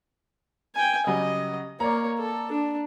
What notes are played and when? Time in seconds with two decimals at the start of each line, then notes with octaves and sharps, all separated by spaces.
0.75 G5 G#5
1.07 C#3 F#3 G3 D#5
1.80 A#3 C#5 D5 A#5
2.18 A4
2.51 D4